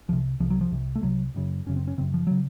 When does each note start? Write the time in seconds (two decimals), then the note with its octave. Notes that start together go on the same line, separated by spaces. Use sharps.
0.08 C2 C3 F3
0.40 C2 C3 F3
0.50 F#3
0.61 F3
0.71 C2 C3
0.95 A3
1.02 C2 C3 F#3
1.34 F#1 F#2 C#3
1.66 F#1 F#2 C#3 C#4
1.76 C4
1.87 C#4
1.98 F#1 F#2 C#3 C4
2.14 F3
2.27 C#3 F#3